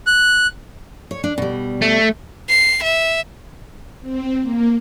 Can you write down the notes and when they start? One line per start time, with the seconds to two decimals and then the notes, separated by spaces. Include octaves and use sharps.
0.07 F#6
1.11 C#5
1.24 D4
1.38 B2 G3
1.82 A3
2.49 C7
2.83 E5
4.02 C4
4.42 A#3